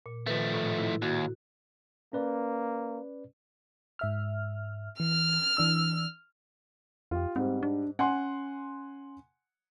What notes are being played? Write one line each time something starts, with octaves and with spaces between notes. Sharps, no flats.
A#2
D#3 F3 A3 B4
A2
E4
D#2 F#4
A#3 C#4 B4 D5
G#2 E5 F6
E3 F6
E3 D4 E6
F2 F4 G4
G#2 G3 C4
D4
C#4 F#5 G#5 C6